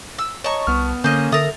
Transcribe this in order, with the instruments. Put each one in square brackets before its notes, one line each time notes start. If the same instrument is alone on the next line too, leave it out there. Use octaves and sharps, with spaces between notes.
[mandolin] E6
[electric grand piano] C#5 D#5 A#5 [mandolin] A5 C#6
[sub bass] C2 [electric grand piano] B3 F6
[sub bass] D3 [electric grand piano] A#3 C#4 [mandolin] C5 D#5
[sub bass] D3 [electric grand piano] A4 E5 A6 [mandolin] A#4 D#6